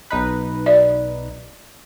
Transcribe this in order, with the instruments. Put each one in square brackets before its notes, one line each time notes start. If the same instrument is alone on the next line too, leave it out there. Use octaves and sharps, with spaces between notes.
[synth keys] B1 D#4 B4
[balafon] F#4 D5 E5